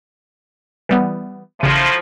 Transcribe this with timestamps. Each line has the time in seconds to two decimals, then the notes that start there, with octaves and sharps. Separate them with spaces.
0.89 E3 G3 B3
1.61 A1 A2 C#3 F3 D#7